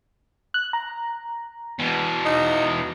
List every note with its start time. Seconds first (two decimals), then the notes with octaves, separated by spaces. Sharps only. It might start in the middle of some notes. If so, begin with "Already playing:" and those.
0.54 F#6
0.73 A#5
1.79 E2 B2
2.26 D#4